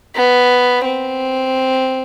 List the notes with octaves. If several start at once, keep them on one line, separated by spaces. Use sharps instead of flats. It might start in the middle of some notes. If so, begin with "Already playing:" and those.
B3
C4